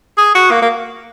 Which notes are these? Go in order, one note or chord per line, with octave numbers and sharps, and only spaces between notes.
G#4
F#4
A#3
A#3